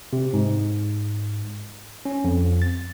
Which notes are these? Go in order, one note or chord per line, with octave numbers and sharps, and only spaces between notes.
C3
G#2
C#4
F2
A6